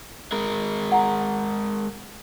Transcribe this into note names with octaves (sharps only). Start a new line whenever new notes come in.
G#3 A#4
F#5 A#5